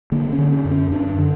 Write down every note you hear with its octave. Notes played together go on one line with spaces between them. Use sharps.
D3 A#3
C#4
D3
C#4
F#2
C#4
F#2 D4
D3